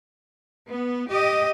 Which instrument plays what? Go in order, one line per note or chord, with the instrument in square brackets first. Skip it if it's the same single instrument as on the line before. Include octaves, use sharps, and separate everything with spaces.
[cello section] B3
G4 D#5